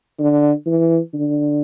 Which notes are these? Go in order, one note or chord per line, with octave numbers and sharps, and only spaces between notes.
D3
E3
D3